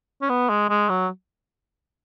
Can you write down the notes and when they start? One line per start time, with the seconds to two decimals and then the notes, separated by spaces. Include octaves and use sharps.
0.22 C#4
0.29 B3
0.49 G#3
0.69 G#3
0.89 F#3